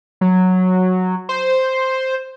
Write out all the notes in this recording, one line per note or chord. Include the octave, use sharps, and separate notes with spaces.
F#3
C5